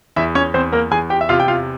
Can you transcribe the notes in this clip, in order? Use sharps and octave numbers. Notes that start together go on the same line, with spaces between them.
E2 E4 E5
C#4 C#5
E2 C4 C5
A#3 A#4
E2 G#4 G#5
G4 G5
E5
C3 F4 F5
G5
F4 F5